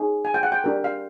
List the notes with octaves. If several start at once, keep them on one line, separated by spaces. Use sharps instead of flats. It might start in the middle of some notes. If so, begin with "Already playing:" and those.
Already playing: D#4 G#4 C#5
G#5
G5
F#5
G5
D4 G4 A#4
F5